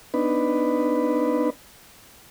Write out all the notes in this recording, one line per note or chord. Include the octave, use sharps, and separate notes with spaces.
B3 D4 D#4 B4